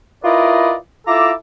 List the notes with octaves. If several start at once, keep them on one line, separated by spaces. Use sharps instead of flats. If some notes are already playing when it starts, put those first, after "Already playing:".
E4 F4 A#4 B4 D5 D#5
E4 F4 A4 A#5 D6